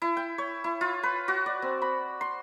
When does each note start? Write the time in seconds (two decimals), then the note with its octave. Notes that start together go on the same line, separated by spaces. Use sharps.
0.02 E4
0.17 G5
0.38 C#5
0.64 E4
0.81 F4
1.03 B4
1.28 F#4
1.46 D5
1.62 C4
1.82 B5
2.21 C6